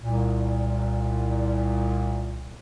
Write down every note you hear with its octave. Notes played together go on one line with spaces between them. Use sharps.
C2 A#2